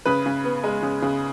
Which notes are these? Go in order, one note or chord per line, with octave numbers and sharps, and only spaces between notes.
C#3 B4
C#3
B3
G#3
C#3
C#3